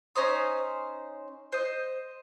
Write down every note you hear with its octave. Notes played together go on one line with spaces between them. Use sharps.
C#4 D#4 C5 D#6
C5 D#5